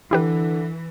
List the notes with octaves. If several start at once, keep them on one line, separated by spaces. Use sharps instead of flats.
D3 E3 E4 G4 B4